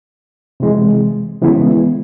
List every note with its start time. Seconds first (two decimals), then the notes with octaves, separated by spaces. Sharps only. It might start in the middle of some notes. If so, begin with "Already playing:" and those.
0.60 C3 E3 G#3
1.42 C#3 E3 G#3 B3 E4